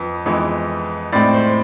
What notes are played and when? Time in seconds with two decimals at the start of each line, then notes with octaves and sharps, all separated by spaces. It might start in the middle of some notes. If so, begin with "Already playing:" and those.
Already playing: F2 B3
0.26 F2 E3 G#3 B3
1.12 A2 G#3 C4 D5
1.34 C5